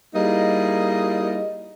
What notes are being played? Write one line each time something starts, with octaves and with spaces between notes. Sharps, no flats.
G3 A#3 D#4 E4 G#4 D#5